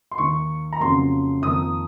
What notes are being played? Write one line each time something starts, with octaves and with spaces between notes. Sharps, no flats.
C6
D#2 D#3 A#3 C#6
A#5
F2 C#3 F#3 A#3 C6
F2 D#3 A#3 D#6